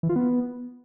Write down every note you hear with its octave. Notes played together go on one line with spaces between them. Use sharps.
E3
F4
B3